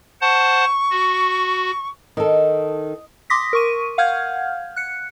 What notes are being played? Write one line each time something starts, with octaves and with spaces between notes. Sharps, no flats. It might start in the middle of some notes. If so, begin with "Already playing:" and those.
C5 F#5 A5 C#6
F#4
D#3 A4 D#5
C6 D6 D#6 A#6 B6
A#4 C#6 D#7
F5 F#5 F6 G6 G#6
F#6 C#7